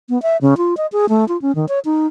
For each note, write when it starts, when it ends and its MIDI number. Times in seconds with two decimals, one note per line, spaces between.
0.09 0.21 59
0.22 0.37 76
0.42 0.57 49
0.57 0.77 65
0.77 0.86 75
0.92 1.06 68
1.09 1.27 57
1.28 1.40 65
1.42 1.54 61
1.55 1.66 51
1.69 1.79 73
1.85 2.07 63